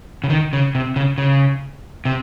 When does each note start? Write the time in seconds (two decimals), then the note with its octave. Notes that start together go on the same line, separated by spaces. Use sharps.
0.24 C#3
0.30 D#3
0.53 C#3
0.75 C3
0.96 C#3
1.18 C#3
2.05 C3